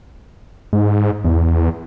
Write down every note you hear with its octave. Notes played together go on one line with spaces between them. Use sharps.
G#2
E2